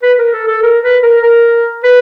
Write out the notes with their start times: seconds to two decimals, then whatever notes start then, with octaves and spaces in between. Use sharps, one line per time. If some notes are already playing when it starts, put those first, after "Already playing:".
0.03 B4
0.18 A#4
0.33 A4
0.48 A4
0.63 A#4
0.83 B4
1.03 A#4
1.23 A#4
1.84 B4